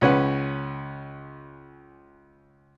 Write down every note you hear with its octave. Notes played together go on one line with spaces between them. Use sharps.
C#2 C#4 B4 F#5